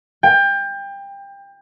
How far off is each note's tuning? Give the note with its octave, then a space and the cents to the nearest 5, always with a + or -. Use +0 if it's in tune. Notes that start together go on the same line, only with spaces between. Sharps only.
G5 +25